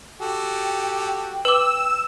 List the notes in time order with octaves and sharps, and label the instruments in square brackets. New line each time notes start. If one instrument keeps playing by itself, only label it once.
[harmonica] F#4 G4 A4 [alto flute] G5
[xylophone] B4 D6 [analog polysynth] E6